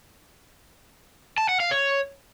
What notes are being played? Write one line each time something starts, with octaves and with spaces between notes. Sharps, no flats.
A5
F#5
F5
C#5